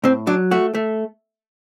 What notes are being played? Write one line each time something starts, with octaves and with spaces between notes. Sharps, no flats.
A2 C4
F#3 D4
A3 F#4
A3